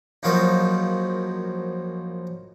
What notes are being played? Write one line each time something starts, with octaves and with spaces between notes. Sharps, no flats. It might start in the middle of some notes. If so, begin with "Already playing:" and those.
A#1 F#2 F3 F#3 D#4 F5